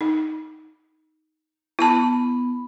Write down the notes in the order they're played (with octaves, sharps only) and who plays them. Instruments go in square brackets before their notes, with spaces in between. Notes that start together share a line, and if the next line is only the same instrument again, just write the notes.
[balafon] D#4
[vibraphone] B3 B5 [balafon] E4 A5